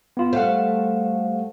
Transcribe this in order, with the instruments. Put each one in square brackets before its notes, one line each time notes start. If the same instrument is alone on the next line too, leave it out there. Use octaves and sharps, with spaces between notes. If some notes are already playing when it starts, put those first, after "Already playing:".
[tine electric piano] B3 F4
[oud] G3 A3 [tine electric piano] C5 F5 F#5